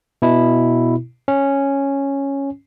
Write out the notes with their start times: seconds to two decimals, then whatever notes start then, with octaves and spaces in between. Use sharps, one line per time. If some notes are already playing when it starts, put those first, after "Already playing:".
0.22 B2 E4
1.28 C#4